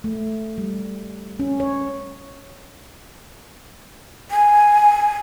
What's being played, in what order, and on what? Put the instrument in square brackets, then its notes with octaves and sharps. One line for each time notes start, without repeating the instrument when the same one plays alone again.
[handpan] A3
G3
C#4
C#5
[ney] G#5